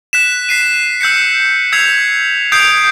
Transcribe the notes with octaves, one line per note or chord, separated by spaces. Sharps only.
F#6 B6 E7
B6 C7 D#7
E6 G6 B6 C#7
E6 G#6 B6 C7 F7
D#6 G6 G#6 C7 D7 F7